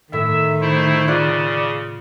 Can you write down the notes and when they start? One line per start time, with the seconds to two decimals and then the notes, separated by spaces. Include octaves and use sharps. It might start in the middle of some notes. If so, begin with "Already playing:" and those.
0.13 A2 D#3 E5
0.62 A3 E4 C5
1.08 C#3 F4 D5 C6 F#6